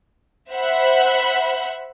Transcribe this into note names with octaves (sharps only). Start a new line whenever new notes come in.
C5 E5 F#5 B5 F#6